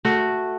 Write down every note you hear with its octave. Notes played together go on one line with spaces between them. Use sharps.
A3 F#4